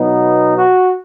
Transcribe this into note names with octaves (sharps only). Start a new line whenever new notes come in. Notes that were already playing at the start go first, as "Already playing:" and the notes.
Already playing: B2 F#3 B3 D#4
F#4